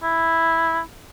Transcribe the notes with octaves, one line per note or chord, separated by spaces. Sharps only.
E4